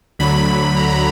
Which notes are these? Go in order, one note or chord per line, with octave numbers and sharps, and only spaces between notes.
D2 D3 F#3 B5
A#5
A#5